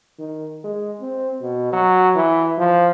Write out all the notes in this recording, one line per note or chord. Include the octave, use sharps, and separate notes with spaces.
D#3
G#3
C4
B2
F#3
E3
F3